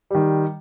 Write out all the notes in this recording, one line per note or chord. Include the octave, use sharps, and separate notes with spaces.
D#3 G3